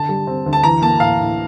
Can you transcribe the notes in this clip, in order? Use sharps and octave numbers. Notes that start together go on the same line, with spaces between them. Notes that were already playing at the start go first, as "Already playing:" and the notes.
Already playing: D3 A5
G3
C4
D2
A5
E3 A#5
A#3 A5
A2 F5
A2